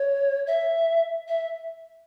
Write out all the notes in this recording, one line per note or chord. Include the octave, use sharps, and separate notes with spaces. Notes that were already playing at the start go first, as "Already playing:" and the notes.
Already playing: C#5
E5
E5